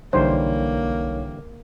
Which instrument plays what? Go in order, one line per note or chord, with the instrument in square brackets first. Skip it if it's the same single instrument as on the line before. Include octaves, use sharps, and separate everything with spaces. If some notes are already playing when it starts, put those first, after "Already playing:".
[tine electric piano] B1 D#4 C#5 [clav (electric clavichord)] D3 E3 G3 [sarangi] A#3 [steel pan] C5